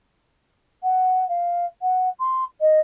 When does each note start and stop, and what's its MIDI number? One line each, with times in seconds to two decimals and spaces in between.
0.83 1.27 78
1.28 1.65 77
1.81 2.09 78
2.19 2.44 84
2.60 2.79 75